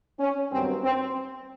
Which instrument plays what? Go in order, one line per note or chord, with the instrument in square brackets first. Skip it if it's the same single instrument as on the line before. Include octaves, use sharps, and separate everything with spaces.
[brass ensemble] C#4
G2 D#3 F#3 B3 C4
C4